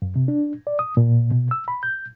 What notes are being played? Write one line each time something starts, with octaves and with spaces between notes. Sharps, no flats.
F#2
C3
D4
D5
D#6
A#2
B2
E6
B5
G6